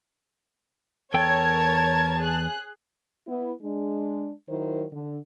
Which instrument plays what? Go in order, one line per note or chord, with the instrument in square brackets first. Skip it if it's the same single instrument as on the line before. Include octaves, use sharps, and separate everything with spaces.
[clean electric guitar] E2 A4 G5 [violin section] A#4 C#5 G#6 [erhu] A5
[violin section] G#4 F#6
[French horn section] B3 E4
G#3 D4
D#3 F#3 E4 A#4 C5
D3